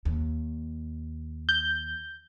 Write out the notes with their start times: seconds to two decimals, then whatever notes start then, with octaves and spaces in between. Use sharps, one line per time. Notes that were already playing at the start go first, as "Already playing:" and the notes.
0.05 D#2
1.49 G6